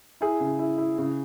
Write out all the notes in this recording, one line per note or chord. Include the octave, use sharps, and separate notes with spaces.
E4 G#4
C#3
E4
E4
C#3